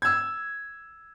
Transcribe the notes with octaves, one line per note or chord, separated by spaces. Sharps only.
E6 G#6